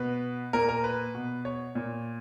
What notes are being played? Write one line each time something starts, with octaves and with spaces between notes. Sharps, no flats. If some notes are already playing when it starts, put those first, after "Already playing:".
Already playing: B2 B4
A#2 A#4
A#4
B4
B2
C#5
A#2